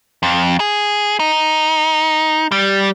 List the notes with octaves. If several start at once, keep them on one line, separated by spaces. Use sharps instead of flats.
F2
G#4
D#4
G3